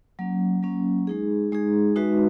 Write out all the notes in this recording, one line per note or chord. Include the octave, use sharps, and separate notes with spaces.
F#3 A#3 C#4
F#3 A#3 C#4
G#3 D#4 G#4
G#3 D#4 G#4
G#3 D#4 F#4 B4 E5